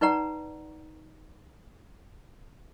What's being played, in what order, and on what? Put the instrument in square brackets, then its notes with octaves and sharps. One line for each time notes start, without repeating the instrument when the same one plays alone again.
[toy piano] D#4 B4 D5 F#5 A#5